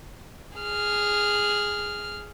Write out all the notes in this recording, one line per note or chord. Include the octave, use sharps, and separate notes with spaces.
G#4 F6